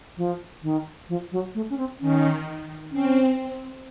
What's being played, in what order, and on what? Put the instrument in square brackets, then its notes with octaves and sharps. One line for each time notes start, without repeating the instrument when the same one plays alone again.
[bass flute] F3
D#3
F3
F#3
A3
C#4
C4
[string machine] D#3 [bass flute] C#4
[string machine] C4 [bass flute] C#4